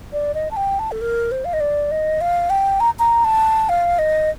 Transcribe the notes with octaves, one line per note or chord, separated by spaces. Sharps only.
D5
D#5
A5
G5
A5
A4
A#4
C5
F5
D#5
D5
D#5
F5
G5
A#5
A#5
A5
F5
D#5